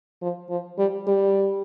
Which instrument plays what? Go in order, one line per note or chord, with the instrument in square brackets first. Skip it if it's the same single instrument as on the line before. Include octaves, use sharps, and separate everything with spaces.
[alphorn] F3
F3
G3
G3